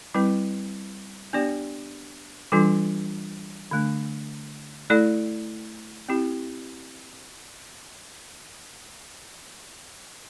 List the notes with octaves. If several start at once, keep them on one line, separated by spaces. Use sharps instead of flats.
G3 C4 E4 B4
B3 D4 G4 D5
E3 G3 D4 F4 A4
D3 A3 D4
A3 E4 A4 D5
C4 E4 G4